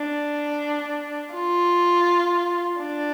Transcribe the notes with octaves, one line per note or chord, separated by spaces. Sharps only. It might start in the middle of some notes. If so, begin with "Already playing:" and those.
Already playing: D4
F4
D4